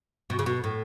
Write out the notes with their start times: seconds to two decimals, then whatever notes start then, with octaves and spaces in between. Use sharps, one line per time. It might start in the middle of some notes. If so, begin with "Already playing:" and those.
0.30 B2
0.39 C#3
0.46 B2
0.64 A2